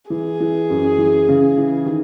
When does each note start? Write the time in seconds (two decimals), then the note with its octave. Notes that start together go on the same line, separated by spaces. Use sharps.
0.10 E3 G#4
0.40 E3
0.70 F#2
0.98 E3
1.28 C#3
1.57 E3
1.86 D#3